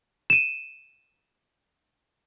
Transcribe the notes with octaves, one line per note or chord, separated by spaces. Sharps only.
D#7 E7